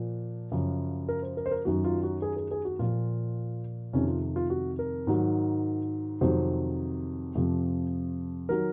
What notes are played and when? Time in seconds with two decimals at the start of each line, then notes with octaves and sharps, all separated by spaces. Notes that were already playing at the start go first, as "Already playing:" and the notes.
Already playing: A#2 F3
0.52 F#2 C#3 F3
1.09 A#4
1.22 C5
1.37 A#4
1.46 C5
1.51 A#4
1.65 F#2 D#3 F#3 F#4
1.84 F4
2.03 F#4
2.22 G#4
2.37 G#4
2.51 G#4
2.65 F#4
2.79 A#2 F3 F4
3.93 F2 C3 D#3 C#4
4.07 F4
4.36 F4
4.50 F#4
4.79 A#4
5.07 G#2 D#3 F#3
6.21 F2 C3 D#3 F#3 C5
7.35 F2 C3 F3
8.49 D#3 F#3 A#4